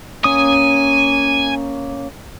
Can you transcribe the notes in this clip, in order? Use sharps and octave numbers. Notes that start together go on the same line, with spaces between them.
A#3 C#4 G#5 D#6